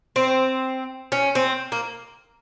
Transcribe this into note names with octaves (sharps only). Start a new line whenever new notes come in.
C4
C#4
C4
A#3